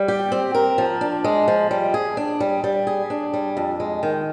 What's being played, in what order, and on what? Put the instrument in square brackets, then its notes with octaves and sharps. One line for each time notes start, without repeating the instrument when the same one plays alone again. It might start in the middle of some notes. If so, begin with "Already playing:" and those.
Already playing: [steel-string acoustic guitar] G3
G4
C4
A#4
F3
D4
G#3
F3
G3
G#4
D4
G3
G3
G#4
D4
G3
F2
G#3
D#3